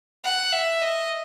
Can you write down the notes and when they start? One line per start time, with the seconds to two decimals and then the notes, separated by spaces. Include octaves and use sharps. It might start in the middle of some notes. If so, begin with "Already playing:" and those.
0.24 F#5
0.53 E5
0.82 D#5